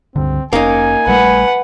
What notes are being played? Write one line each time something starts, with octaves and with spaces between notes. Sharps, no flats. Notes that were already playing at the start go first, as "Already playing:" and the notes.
C#2 G2 D3 C4
F1 A#3 C#4 D#4 G#5
A#1 G3 A3 B4 F#5